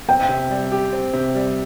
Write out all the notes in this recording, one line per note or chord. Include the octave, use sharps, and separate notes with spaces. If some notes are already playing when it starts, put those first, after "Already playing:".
C4 G5
C3
G3
G4
C4
C3
G3